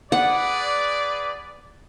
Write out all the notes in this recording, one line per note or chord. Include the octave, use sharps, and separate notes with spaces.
G#4 B4 D5 F#5